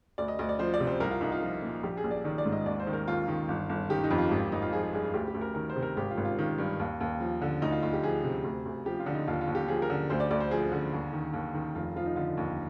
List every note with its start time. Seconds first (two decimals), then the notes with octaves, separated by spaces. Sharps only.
0.18 D2 D5
0.28 D#5
0.39 D2 D#5
0.49 D5
0.59 F3 C5
0.74 D5
0.80 C3
0.87 C5
1.00 C2 A#4
1.11 F4
1.21 C2 D#4
1.32 F4
1.42 F3
1.62 A#2
1.83 A#1 G4
1.97 G#4
2.04 A#1
2.11 D5
2.25 D#3 D5
2.38 D5
2.45 G#2
2.52 D#5
2.66 D#2 D5
2.80 C5
2.87 D#3
2.93 A#4
3.08 D#2 F4
3.28 D#3
3.49 G1
3.69 G1
3.90 D#3 G4
4.04 D#4
4.10 F2
4.18 F4
4.31 G#1 G4
4.52 G#1 D#4
4.62 F4
4.73 F3 G#4
4.83 G#4
4.93 G2 G#4
5.03 G#4
5.14 D2 G4
5.28 G4
5.34 D2
5.41 A#4
5.55 D#3 A#4
5.70 C5
5.76 C3
5.82 A#4
5.97 G#1 G4
6.11 F4
6.17 G#1
6.25 F4
6.38 D#3
6.58 G2
6.80 D#2
7.01 D#2
7.20 F3
7.41 D3
7.62 D2 D#4
7.72 F4
7.82 D2 F4
7.93 G4
8.03 F3 G#4
8.24 C3
8.44 D2
8.65 D2
8.86 F3 G4
9.00 F4
9.06 D3
9.14 D#4
9.27 D#2 F4
9.41 F4
9.48 D#2
9.55 G4
9.68 F3 G#4
9.82 A#4
9.90 D3
10.10 D2 C5
10.20 D5
10.31 D2 D5
10.41 C5
10.51 F3 G#4
10.72 D3
10.93 D#2
11.13 D#3
11.33 D#2
11.54 D#3
11.75 F1 F4
11.96 F3 F4
12.06 D#4
12.16 D3 F4
12.37 D#2